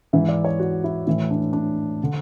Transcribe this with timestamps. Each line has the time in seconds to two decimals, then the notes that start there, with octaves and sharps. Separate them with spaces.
0.13 G#2 E3 E5
0.29 D5
0.45 C#5
0.59 F#4
0.84 E4
1.07 A2 E3 E4
1.30 D4
1.53 D4
2.04 D3